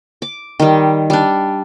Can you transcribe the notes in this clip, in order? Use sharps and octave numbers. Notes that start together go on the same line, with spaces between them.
D6
D#3 G3
G3 D4